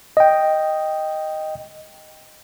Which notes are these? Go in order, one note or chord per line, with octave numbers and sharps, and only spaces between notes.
D#5 G5